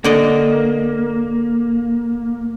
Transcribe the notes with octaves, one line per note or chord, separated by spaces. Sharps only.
D3 A#3 D5 D#5